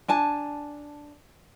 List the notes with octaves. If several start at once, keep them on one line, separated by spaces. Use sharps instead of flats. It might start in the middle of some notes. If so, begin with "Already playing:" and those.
D4 G#5 A5